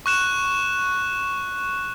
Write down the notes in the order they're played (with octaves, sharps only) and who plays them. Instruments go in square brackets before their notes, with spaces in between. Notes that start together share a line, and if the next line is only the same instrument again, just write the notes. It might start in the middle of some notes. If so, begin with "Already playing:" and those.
[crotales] C#6 F#6 E7